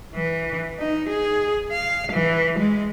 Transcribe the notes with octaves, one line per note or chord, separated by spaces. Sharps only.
E3
D#4
G#4
F5
E3
G#3